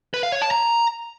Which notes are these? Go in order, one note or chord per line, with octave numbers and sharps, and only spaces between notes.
B4
F5
C#5
A5
A#5